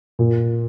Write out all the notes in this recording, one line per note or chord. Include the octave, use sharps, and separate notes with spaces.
A#2